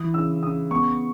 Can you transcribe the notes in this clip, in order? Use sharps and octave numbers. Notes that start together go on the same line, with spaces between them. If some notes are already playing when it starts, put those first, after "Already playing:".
Already playing: E3 D#6
C#3 E6
C#3 D#6
B3 C#6